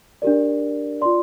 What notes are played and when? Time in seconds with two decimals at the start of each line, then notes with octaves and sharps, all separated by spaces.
0.22 D4 G4 A#4 D5
1.01 F4 D5 C6